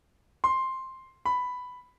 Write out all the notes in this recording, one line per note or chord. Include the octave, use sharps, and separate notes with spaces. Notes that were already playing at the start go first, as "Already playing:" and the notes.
C6
B5